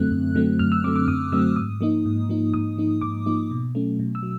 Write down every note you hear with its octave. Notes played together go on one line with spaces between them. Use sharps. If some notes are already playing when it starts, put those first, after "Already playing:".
Already playing: F#2 D3 F#3 A3 C4 F#6
F#2
D3 F#3 A3 C4
F#2 F6
E6
D3 F#3 A3 C4 D6
D6
F#2 D#6
D3 F#3 A3 C4 E6
G#2 D#6
F3 A#3 D#4
G#2
F3 A#3 D#4
G#2 D#6
F3 A#3 D#4
G#2 D6
F3 A#3 D#4
B2
F#3 A3 C#4
B2
E6
F#3